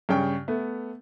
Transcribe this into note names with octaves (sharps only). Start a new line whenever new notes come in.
G2 C#3 C#4 G5 C#6
A3 B3